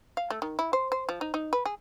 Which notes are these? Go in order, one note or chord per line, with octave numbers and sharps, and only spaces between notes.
F5
A3
D#3
E4
C5
C5
F3
D#4
D#4
B4
G#4